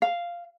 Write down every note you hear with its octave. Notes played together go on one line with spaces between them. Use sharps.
F5